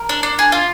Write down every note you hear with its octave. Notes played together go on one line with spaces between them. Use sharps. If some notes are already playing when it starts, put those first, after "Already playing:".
Already playing: A#4
D4
D4
G#4
F4